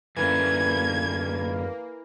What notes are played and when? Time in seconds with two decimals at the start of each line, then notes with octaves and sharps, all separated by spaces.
0.16 F#2 D3 E3 A#3 G#6